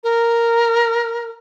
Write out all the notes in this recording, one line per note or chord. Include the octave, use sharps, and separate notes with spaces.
A#4